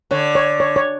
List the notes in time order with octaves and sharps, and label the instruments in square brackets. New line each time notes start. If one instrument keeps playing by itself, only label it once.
[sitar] D3 [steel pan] C#5
[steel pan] C#5
C#5
C#5